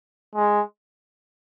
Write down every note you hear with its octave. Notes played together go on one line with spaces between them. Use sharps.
G#3